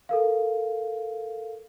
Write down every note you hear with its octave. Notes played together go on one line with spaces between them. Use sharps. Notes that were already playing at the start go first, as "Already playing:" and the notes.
A4 A#4 F5